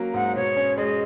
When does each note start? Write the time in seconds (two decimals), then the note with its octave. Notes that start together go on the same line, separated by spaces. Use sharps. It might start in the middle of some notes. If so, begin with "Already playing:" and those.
Already playing: F#3 A#3 C#4
0.14 G#2 F#5
0.35 B2 C#5
0.57 C#4
0.78 G#3 D#5